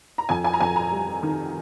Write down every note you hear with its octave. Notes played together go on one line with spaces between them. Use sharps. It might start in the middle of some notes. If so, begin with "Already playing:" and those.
A#5
F2 G#5
G#5
A#5
F2 G#5
A#5
G3
D#3